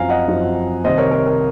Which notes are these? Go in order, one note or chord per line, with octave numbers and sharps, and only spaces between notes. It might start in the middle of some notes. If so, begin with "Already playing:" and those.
Already playing: F#2 F3 C4 F5 G#5 A#5
D#5 F#5
F#2 F3 C4
C2 C3 D#3 C5 D#5
A#4 C#5
A#4
A#4